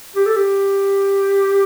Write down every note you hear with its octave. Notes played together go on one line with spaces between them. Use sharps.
G4
A4
G4